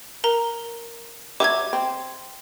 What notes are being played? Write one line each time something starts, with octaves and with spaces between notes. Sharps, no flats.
A#4 A#5
F#3 C#5 E5 D6 G#6
C4